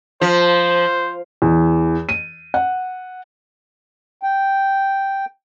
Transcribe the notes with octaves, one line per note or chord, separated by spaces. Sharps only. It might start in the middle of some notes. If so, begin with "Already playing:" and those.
F3 C5
E2
D#7
F#5
G5